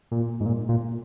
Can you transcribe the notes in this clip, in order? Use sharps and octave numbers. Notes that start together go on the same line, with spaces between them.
A#2
G#2
A#2
A#2